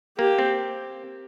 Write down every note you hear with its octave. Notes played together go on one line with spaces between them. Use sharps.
A#3 G4
C4